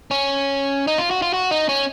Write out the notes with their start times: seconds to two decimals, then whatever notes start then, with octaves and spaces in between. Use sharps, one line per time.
0.11 C#4
0.87 D#4
0.98 F4
1.11 F#4
1.22 F4
1.33 F#4
1.51 D#4
1.69 C#4